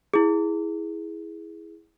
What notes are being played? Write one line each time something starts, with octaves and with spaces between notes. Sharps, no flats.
E4 G#4